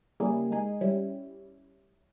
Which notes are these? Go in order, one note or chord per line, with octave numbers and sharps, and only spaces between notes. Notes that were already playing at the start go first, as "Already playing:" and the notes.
C#3 G3 A#3 E4 G#4
G#3 D#4 G#4
G3 C#4 E4